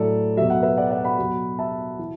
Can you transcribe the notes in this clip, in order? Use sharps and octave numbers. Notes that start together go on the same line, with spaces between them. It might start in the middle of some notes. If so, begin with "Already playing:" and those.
Already playing: A2 F#3 A4 D5
B2 F#3 E5
F#5
B4 E5
D5 F#5
D5 F#5
F#5 B5
B2 F#3
E5 A5
E3